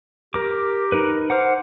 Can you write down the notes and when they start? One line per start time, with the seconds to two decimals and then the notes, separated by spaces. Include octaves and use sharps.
0.34 G4 A#4 D6
0.92 D#4 A#4 B4
1.30 C5 F#5 D6 F6